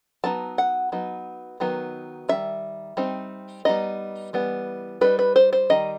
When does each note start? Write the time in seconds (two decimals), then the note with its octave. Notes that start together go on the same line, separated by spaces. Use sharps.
0.24 F#3 B3 D#4 A5
0.58 F#5
0.92 F#3 B3 D#4
1.60 D#3 F#3 B3 D#4
2.29 D#3 G3 D#4 E5
2.97 G3 C4 D#4
3.65 G3 B3 D#4 D#5
4.33 E3 G3 B3
5.01 G3 D#4 B4
5.19 B4
5.36 C5
5.53 C5
5.70 D#3 G3 D#4 D#5